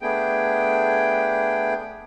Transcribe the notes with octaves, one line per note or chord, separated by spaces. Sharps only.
A3 B3 D4 G#4 G5